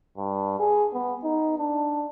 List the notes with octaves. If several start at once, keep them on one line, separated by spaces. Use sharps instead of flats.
G2
G#4
B3
D#4
D4